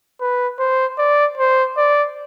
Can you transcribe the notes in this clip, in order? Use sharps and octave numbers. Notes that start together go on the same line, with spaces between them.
B4
C5
D5
C5
D5